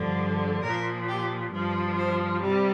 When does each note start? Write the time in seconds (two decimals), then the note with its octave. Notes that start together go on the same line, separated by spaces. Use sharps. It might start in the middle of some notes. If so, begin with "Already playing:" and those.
Already playing: G2 D3 F3
0.62 A#2 F3 A#4
1.08 G4
1.52 G2 F3
1.97 C5
2.42 C3 G3